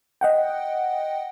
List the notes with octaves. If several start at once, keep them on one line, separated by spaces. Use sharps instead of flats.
D#5 F#5 G5